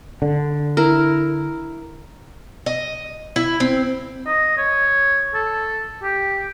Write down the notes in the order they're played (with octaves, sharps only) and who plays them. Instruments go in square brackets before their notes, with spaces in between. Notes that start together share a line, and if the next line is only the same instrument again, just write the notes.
[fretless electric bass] D3
[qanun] E4 A#4
[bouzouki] D#5
E4
C4
[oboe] D#5
C#5
A4
G4